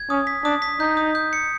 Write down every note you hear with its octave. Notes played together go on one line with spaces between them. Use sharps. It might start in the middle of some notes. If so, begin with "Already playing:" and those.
Already playing: G#6
C#4 D#6
B6
D4 D#6
B6
D#4 G6
D#6
G6
C#7